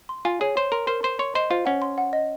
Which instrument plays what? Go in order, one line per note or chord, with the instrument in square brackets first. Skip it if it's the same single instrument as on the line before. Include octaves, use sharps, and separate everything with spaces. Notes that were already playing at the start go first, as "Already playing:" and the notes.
[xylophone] C6
[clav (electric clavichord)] F4 [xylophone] G#5
[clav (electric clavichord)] G#4 [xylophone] C#5
[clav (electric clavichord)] C5 [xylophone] C#5
[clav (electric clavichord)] A#4 [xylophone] C6
[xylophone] A#4 [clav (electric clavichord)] C5
[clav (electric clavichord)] C5 [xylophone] C6
[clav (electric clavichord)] C#5 [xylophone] C6
[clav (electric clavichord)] C5 [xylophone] D#5
[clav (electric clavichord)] F4 [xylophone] C5
[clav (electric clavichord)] C#4 [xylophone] F#5
[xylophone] C6
F#5
D#5